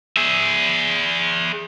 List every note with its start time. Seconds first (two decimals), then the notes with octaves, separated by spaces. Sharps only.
0.17 G#4 E5